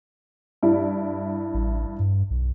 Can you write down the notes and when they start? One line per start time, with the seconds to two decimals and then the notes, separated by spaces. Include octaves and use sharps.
0.63 G2 E4
1.54 A1
1.99 G2
2.30 B1